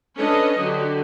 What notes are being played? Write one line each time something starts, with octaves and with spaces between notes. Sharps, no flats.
C#4 D4 A4 B4 C#5 D#5
D3 F#3 F#4 G4